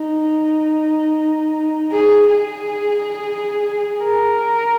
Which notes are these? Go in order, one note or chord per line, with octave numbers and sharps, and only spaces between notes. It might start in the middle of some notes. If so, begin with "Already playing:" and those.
Already playing: D#4
G#4
G#4
A#4